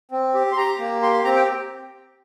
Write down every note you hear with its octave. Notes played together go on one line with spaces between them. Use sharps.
C4
G4
C6
G4 A#5
A#3
G4 C6
C6
C4 A#5
G5